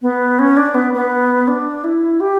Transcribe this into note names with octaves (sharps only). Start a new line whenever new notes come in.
B3
C#4
D4
B3
B3
D4
E4
G4